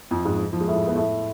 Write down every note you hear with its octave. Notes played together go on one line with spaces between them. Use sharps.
F2 F3
G#2 G#3
F3
G#3
A2 A3
B3
A2 A3